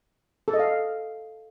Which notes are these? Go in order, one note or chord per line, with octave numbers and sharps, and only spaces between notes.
A4
D#5
F5